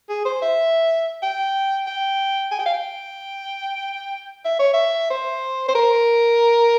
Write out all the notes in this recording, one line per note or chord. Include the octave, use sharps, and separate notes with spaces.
G#4
C5
E5
G5
G5
G#5
G5
F5
G5
E5
C#5
E5
C5
C5
A#4